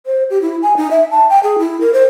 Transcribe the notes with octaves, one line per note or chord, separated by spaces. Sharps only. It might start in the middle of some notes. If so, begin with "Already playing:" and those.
C5
G4
E4
G#5
D#4
E5
A5
G5
G#4
E4
A#4
C5